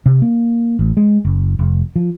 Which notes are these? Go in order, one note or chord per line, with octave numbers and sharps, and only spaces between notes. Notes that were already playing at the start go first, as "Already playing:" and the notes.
C3
A#3
A1
G#3
F#1
F1
F3